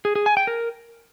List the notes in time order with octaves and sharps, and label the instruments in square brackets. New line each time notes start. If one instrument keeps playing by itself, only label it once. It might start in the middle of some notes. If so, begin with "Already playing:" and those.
[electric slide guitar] G#4
G#4
G#5
G5
A#4